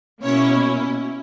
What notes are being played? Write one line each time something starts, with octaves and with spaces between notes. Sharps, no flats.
B2 A#3 C#4 E4 C#5